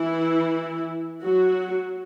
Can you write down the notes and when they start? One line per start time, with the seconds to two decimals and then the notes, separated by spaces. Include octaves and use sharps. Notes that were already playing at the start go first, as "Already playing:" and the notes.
Already playing: E3 E4
1.23 F#3 F#4